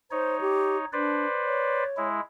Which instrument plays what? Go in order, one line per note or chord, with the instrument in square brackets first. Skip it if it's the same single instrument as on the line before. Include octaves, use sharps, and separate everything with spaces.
[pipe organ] D#4 C#5 [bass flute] C5
[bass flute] G4
[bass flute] D4 [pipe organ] B4 C5 D5
[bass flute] C#5
[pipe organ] G#3 E4